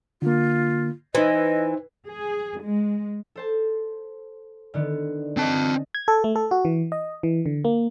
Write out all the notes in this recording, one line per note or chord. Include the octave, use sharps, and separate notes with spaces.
D3 A#3 F4
E3 D#4 C5 D#5
G#4
G#3
A4 C5 A5
D3 D#3 B3
C4 D#5 A5 A6
G#6
A4
A3
A4
F#4
E3
D#5
E3
D3
A#3